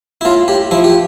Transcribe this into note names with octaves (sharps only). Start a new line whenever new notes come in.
E4
A2 F4
A2 G4
F3 E4
G4